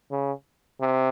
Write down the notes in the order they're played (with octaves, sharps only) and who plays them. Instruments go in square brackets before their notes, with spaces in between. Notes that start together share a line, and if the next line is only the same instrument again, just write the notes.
[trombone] C#3
C3